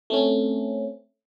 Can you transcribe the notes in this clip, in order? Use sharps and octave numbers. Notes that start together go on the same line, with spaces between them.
A3 C4 C#4